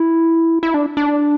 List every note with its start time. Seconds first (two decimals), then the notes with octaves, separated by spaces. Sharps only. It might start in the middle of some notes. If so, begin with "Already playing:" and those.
Already playing: E4
0.63 E4
0.74 D4
0.97 D4